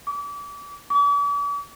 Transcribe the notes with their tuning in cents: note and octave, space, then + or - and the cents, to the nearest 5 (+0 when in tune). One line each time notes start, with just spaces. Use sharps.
D6 -35
D6 -45